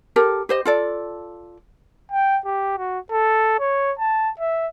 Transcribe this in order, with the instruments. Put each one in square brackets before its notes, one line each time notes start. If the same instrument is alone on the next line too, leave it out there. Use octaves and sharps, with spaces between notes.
[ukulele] G4 A4 A#4
G4 C5 D#5
F4 A4 D5
[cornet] G5
G4
F#4
A4
C#5
A5
E5